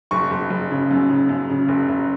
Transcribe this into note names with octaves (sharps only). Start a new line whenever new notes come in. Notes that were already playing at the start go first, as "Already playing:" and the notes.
F#1 C#6
F#1
F#1
C#3
F#2
C#3
F#2
C#3
F#1
F#1